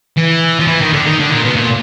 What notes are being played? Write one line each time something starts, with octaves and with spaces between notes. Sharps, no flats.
E3
F3
E3
D#3
D3
D#3
D3
A#2
B2
A#2